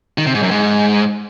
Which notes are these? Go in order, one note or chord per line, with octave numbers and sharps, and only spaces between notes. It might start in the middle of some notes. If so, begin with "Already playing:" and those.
D#3
C3
G#2
F#2
G#2